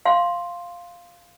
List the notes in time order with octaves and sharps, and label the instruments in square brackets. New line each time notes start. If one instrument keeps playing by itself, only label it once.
[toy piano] F5 C6